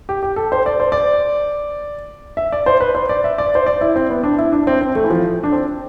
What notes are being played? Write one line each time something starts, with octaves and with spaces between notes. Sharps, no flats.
G4
G4
A4
C5
D5
C5
D5
E5
D5
C5
B4
C5
D5
E5
D5
C5
D5
E4
C4
B3
D4
E4
D4
C4
C4
A3
E3
F3
D4
C4